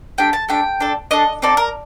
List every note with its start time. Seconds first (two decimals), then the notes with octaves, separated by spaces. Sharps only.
0.18 A3 D4 G4 G5
0.33 A5
0.49 A3 D4 G4 G5
0.80 D4 A4
1.11 D4 A4 D#5
1.42 C4 D#4 A4 D5
1.57 A#4